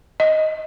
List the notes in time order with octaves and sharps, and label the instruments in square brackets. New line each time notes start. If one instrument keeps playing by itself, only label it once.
[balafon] D#5